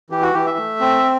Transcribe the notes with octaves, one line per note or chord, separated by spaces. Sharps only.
E3 G4
F#4
E3 G4
E5
A3
C4